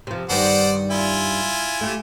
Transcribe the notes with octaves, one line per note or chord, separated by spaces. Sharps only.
C3 F3
G2 D#3 G3 C5 D5 F#5
E4 F4 G#5
A3 G4